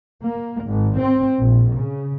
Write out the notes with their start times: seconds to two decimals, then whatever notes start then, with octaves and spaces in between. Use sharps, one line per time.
0.23 A#3
0.63 G#1
0.98 C4
1.39 A#1
1.76 C#3